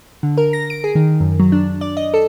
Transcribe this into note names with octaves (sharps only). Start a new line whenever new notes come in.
D3
A#4
A#6
D7
G#4
D#3
F#2
F#3
D4
D5
D#5
A4